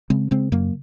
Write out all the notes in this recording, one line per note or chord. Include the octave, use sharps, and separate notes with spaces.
C#3 G#3 C4
C#3 G#3 C4
F#2 F#3 A#3